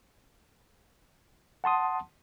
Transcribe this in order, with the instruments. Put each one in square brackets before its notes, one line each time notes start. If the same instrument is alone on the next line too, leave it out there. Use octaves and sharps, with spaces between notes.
[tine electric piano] F#5 A5 C6 D#6